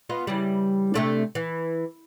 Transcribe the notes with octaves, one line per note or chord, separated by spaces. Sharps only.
B3 F4 D#5
C#3 E3 G3
C3 A3 D4
E3